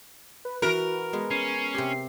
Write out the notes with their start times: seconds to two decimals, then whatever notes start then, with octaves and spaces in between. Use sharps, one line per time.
0.45 B4
0.62 E3 F#4 A#4 B4
1.13 G#3 B3
1.31 C#4 C7
1.74 C3 G4